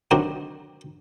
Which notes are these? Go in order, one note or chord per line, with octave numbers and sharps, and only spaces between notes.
D#3 F#3 C4 D4